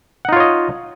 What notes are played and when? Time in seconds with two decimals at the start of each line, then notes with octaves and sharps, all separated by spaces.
0.25 F#5
0.29 D#4
0.32 F4
0.36 C#5
0.40 D#5